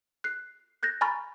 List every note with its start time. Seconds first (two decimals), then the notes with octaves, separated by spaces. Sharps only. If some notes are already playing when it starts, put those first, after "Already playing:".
0.24 F#6 C7
0.83 F#6 G6 A6 A#6
1.01 G#5 A#5 B5 C#6 F6 A6